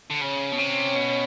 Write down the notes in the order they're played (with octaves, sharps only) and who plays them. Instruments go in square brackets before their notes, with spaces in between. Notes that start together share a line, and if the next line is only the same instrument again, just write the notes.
[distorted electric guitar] D3
[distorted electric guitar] C#3 [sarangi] C#4
[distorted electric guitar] B2
C3
B2